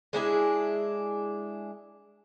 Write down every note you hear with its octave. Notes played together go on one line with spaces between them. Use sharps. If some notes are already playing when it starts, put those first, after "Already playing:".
G#3 D4 E4 G#4